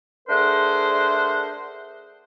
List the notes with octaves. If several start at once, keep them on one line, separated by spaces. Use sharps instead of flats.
A3 D4 G#4 A#4 C5 F#5